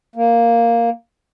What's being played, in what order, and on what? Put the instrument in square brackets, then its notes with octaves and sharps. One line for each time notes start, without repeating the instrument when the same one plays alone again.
[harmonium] A#3